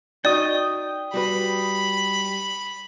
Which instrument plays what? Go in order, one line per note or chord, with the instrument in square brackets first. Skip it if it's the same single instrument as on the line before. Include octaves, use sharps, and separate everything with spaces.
[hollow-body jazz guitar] D#4 F#4 [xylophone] D5 [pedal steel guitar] G5 D#6
[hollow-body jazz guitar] G3 F#4 B4 [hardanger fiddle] B5